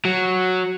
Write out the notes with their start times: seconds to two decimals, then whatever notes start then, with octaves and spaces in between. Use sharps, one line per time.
0.05 F#3